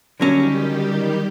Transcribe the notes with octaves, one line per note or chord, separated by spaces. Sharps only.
D3 D#3 F#3 G3 C#4 G4